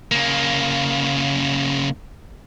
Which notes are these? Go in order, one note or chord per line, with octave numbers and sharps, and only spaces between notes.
C#3 A#3